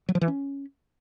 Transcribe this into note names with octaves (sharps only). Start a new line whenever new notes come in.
F#3
F3
E3
C#4